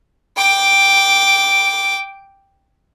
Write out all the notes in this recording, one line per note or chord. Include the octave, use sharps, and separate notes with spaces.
G5 D6